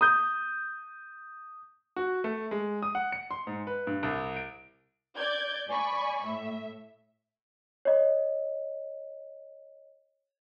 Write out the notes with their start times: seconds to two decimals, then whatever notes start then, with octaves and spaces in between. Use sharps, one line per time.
0.01 D#6 G6
1.96 F#4
2.24 A3
2.51 G#3
2.82 D#6
2.95 F#5
3.12 C#7
3.31 C6
3.47 G#2
3.67 B4
3.87 G2
4.03 C2
4.36 D7
5.16 D5 G6 G#6
5.68 D5 G#5 B5 C#6
6.25 A2 E5
7.85 C#5 D#5